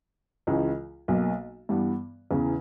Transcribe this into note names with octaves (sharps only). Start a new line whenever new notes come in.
C#2 C#3 E3 G#3
B1 B2 A#3
G2 E3 G3 B3
E2 C#3 E3